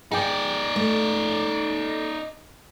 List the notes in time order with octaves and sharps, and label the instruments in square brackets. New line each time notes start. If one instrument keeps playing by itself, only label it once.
[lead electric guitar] D#4 D5 [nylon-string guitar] G#4 G5
[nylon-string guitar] A3